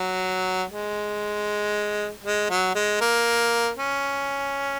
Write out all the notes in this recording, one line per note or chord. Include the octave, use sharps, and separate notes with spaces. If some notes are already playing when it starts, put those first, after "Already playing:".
Already playing: F#3
G#3
G#3
F#3
G#3
A#3
C#4